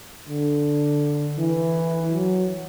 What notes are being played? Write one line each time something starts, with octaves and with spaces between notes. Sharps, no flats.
D3
E3
F#3